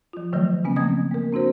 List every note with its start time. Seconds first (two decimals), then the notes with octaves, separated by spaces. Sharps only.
0.13 F3 F4
0.33 D3 D#3 F3 F#3 A3
0.64 C#3 A#3 B3 C#4 G#5
0.76 F3 A3 C4 D#5 D#6 G#6
1.11 A#3 A#4
1.32 C4 D4 F#4 C5